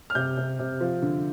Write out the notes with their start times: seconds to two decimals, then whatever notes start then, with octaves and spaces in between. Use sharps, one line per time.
0.10 F6
0.15 C3 G6
0.37 C3
0.59 C3
0.81 F3
1.02 D3